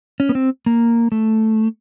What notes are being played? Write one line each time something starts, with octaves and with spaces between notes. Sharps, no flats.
C#4
B3
C4
A#3
A3